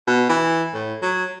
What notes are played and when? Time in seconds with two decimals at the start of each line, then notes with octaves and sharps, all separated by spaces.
0.08 B2
0.29 E3
0.74 A2
1.02 F#3